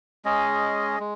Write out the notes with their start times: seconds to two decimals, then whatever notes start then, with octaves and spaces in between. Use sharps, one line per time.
0.25 G#3 C#4 G#4 D#5
1.00 G#3